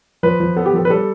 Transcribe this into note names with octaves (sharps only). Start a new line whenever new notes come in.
F3 B4
F3
B3 A4
G4
F3 A4
B4
G3 A4